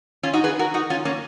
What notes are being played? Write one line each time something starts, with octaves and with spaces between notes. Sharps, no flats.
C#4 F4
D#4 F#4
G#4 B4
F#4 A#4
D#4 F#4
C#4 F4
A#3 C#4